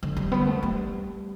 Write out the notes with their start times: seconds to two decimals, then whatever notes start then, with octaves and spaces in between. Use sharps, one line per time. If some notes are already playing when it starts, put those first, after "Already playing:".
0.03 D3
0.17 G3
0.32 B3
0.47 A3
0.63 G3